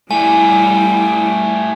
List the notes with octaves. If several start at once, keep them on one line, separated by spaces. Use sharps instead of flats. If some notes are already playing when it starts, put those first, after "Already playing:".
G3 A3 E4 G4 G#5